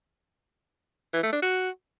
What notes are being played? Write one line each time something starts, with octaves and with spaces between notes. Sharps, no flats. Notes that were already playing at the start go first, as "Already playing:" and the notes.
E3
A3
D4
F#4